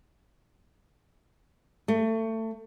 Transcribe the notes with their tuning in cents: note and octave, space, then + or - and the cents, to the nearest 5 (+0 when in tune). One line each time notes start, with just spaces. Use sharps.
A3 +25